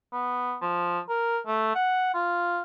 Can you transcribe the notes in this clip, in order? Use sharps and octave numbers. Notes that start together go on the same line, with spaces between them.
B3
F3
A#4
A3
F#5
F4